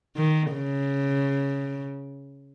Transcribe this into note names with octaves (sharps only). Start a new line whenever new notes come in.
D#3
C#3